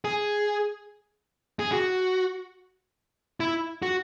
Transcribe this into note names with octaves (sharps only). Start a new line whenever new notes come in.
G#4
G#4
F#4
E4
F#4